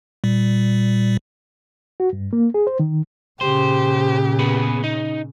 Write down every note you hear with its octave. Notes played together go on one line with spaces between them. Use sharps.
A#2 G3
F#4
G2
A#3
G#4
C5
D#3
A#2 C#3 G4 C5
B3 G#4 B4
D#4